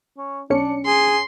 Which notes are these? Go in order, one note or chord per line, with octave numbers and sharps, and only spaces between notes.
C#4
B1 C#4 D4 C#7
G#4 C6